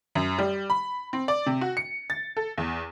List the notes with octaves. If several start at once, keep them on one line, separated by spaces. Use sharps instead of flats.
F#2
G3
B5
C4
D5
C3
F#4
C#7
A6
A4
E2